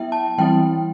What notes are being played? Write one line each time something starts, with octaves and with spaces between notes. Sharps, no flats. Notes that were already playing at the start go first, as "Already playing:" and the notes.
Already playing: F#3 B3 E4 E5 G5
A5
E3 G3 C4 E4 G5